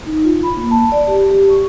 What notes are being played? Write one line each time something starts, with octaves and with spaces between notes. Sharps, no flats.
D#4
F4
B5
A#3
A5
D5
G4
G4
C#6